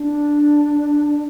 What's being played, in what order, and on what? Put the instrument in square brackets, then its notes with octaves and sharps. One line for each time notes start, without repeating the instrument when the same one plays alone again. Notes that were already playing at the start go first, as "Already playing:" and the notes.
Already playing: [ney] D4